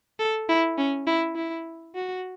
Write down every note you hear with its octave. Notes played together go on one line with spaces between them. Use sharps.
A4
E4
C#4
E4
E4
F#4